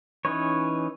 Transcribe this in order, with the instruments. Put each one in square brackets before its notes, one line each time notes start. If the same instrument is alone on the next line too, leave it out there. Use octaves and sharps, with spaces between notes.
[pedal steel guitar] E3 C#4 D#4 B4 C#5